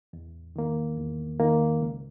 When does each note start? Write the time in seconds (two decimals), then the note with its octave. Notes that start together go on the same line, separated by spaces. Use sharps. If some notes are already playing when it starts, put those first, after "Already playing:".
0.13 E2
0.56 D#3 A#3
0.97 E2
1.40 D#3 A#3
1.81 C#2